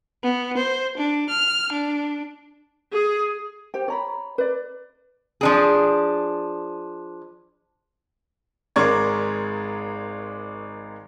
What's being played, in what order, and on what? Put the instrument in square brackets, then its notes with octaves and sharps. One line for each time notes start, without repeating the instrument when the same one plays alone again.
[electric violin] B3
C5
D4
F6
D4
[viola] G#4
[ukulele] G4 C5 G5
C#5 A#5 B5
B4 D5
[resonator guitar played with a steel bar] F3 D4 G#4
[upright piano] G#1 G#3 A#4 D5 C#6 G#6